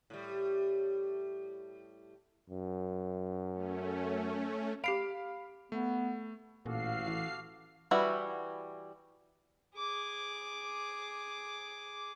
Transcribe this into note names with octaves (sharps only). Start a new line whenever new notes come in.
A2 G3
F#2
A3 C#4
G4 F5 B5 C7 D7 F7
A3 B3
A1 A#2 F#4 A4 F5 D6 C7
E3
E3 G3 E4 F#4
G#4 D6